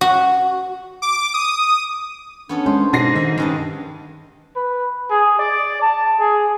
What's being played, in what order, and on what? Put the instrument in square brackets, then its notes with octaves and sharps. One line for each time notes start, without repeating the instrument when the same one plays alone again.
[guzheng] F#4
[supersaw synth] D6
D#6
[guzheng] B3 C#4 A4 [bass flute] D4
[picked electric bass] G#3 C#4 [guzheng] C5
[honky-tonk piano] G#2 A#6 C7 [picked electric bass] B2
[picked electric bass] D#3 [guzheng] E5
[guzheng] G2 D#5 A5 [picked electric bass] D#3 C#4
[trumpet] B4
G#4
D5
A5
G#4